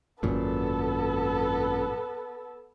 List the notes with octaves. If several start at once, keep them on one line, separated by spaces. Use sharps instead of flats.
G#1 F#2 A#2 B3 A4